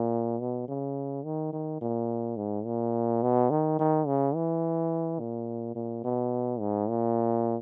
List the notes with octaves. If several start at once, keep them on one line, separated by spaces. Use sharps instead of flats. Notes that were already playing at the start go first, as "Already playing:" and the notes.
Already playing: A#2
B2
C#3
D#3
D#3
A#2
G#2
A#2
B2
D#3
D#3
C#3
E3
A#2
A#2
B2
G#2
A#2